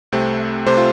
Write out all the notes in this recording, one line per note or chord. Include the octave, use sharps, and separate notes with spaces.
C2 C3 A3 C4
C3 A3 G4 C5
F4